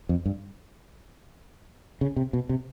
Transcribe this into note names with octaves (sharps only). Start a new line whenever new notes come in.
F2
G2
C#3
C3
B2
C3